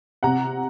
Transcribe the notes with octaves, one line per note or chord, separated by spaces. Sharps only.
C3 F#5 A#5